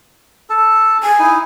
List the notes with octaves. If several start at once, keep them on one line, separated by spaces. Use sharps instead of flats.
A4 A5
G#5
D#4 E4